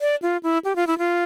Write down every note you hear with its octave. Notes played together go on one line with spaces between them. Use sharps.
D5
F4
E4
G4
F4
E4
F4